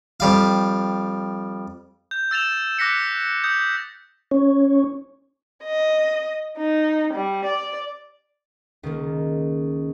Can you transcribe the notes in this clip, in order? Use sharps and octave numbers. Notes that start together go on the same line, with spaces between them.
F2 G3 F5
G6
E6 A6 E7 F7
D6 F#6 A#6 B6 C#7 E7
D#6 G6
C#4
D#5
D#4
G3
D5
C#2 D#3 A#3